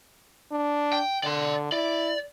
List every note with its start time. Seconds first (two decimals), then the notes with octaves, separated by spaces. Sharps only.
0.52 D4
0.93 G5
1.24 D3 D5 C6
1.72 E4 D5